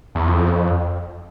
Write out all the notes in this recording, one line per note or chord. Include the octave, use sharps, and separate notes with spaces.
E2
F2